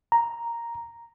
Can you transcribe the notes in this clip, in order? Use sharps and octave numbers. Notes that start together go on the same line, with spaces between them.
A#5